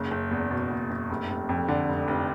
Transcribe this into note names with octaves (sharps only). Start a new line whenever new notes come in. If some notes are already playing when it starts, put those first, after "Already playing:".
Already playing: F#1 C#3
F#1
E2
B2
F#1
F#1
F1
F1
F2
D3
F1
F1